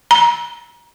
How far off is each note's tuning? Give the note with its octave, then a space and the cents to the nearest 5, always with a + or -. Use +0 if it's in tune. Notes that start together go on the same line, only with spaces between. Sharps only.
A#5 +30